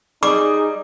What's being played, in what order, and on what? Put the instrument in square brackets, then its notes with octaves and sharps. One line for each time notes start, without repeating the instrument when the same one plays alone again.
[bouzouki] G3 [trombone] D#4 [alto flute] G#4 [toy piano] D6